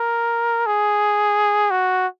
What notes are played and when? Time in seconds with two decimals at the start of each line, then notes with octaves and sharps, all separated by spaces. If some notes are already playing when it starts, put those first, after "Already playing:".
Already playing: A#4
0.67 G#4
1.71 F#4